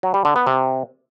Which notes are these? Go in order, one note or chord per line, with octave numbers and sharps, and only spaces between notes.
F#3
G3
D3
B3
C3